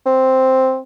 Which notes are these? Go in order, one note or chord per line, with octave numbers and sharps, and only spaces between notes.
C4